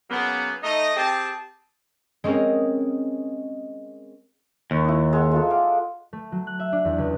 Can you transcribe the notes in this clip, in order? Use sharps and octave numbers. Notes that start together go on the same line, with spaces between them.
C#3 F#3 A#3 B3
A3 D#4 D#5
C4 G4 G#4 G5 A5
G#3 C4 C#4 G#4 A#4
D#2
D#4 E4
G#3 F#5
G#3 F4 A4
F5 F#5 D6
A3
F#3
F#6
E5
D4
E2
C#2